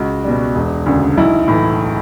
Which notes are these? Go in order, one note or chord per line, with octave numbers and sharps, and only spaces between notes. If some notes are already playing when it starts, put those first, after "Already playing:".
Already playing: C#2 F#4
B2 G3
E1
D2 C#3
B1 E4
A2 E3